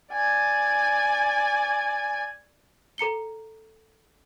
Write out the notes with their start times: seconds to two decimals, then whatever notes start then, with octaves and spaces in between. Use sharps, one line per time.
0.13 D5 G#5
2.98 A4 A#5 C#7 G7